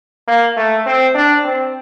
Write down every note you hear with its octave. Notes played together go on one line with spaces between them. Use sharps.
A#3
A3
C4
D4
C4